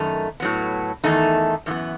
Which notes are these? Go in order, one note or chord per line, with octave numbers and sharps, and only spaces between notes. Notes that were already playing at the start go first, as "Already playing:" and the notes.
Already playing: F#2 D#3 A3 D#4
A2 F#3 B3
E2 D#3 A3 D#4
F#2 E3 B3